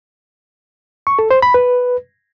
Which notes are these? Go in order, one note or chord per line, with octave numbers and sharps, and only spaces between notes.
C#6
A4
C5
B5
B4